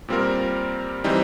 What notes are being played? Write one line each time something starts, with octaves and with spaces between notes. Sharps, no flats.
A#2 G3 C4 F4 A#4
E3 G3 C4 D#4